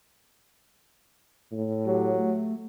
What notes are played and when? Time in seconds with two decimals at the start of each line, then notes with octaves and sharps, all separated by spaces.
1.52 A2
1.87 F#3 G4
2.16 A3